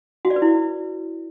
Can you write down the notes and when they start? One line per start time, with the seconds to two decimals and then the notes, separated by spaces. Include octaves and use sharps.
0.25 F#4
0.30 D5
0.36 B4
0.42 E4